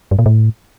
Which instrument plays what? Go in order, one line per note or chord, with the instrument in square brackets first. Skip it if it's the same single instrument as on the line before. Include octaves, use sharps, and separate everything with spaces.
[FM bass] G2
A#2
A2